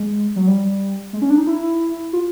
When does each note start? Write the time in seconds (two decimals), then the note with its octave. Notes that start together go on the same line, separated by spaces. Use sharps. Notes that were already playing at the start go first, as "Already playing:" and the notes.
Already playing: G#3
0.36 F#3
0.47 G3
1.13 G#3
1.22 C#4
1.30 D4
1.38 D#4
1.47 E4
2.13 F4